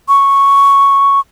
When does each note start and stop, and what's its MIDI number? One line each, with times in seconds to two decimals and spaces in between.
0.08 1.20 85